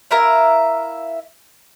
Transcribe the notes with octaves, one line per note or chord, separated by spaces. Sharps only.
E4 A#4 E5 F5